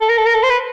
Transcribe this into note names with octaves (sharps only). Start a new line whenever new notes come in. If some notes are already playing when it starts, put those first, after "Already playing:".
A4
A#4
A4
A#4
A4
C5
B4